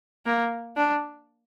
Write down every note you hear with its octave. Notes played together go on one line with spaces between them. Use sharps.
A#3
D4